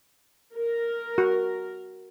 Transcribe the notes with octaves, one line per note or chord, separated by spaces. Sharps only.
A#4
F#4